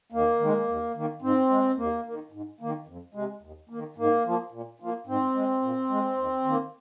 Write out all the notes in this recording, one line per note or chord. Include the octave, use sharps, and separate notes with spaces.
D#2 A#3
D#3 G#3
D#2
D#3 A#3
G#2 C4
G#3
D#2 A#3
D#3 A#3
G#2
D#3 A#3
F2
C3 G#3
D#2
D#3 A#3
G#2 A#3
F3 A#3
A#2
F3 A#3
G#2 C4
G#3
A#2
G#3
D#2
D#3 A#3